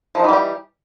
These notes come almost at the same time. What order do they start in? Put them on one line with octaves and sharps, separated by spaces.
F3 D#4 E3 G3 G4